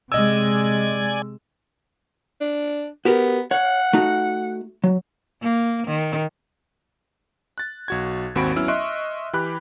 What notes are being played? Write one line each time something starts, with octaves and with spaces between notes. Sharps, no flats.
C3 G#3 D5 D#5 G#5 E6 G#6
D4
B3 F#4 G4 A#4
C#5 F#5
A3 D#4 F#4
F#3
A#3
D#3
F#6 A6
B1 F#4 G#6
G#1 D#2 C4 F#4 B5 D7
F#3 B3 C#4 E4 E6 F6
D#5 E5 C6 C#6 F#6 D7
E3 G4 B5 F#6